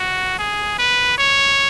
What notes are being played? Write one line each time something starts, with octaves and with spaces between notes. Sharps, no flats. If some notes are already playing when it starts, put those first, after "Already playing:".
Already playing: F#4
G#4
B4
C#5